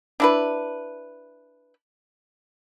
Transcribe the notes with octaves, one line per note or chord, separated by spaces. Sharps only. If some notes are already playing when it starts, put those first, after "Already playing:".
D4 E4 B4